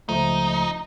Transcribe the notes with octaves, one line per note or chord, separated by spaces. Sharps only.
C#2 F3 A3 D#4